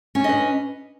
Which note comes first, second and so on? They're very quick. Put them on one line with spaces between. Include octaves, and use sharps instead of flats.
C#4 D4 D#5 B4